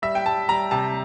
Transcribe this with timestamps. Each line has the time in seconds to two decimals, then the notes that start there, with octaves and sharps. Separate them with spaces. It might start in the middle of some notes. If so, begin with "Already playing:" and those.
0.02 G3 E5
0.15 G5
0.26 G3 A5
0.49 G3 A#5
0.71 C3 A5